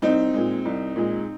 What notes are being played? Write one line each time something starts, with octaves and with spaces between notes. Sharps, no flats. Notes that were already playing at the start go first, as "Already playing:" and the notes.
C2 C4 D#4
A#2 G#3
C2
A#2 G#3